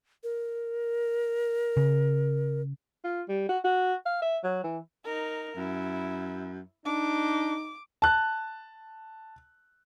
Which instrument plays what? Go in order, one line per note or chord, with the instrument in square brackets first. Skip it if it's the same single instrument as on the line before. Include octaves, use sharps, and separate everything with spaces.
[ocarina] A#4
[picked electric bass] C#3
[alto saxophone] F4
G3
F#4
F#4
F5
E5
F#3
E3
[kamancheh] D#4 A#4
[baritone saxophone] F#2 [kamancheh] E4
[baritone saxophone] D4 [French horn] D#4 [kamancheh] D6
[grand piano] A5 F#6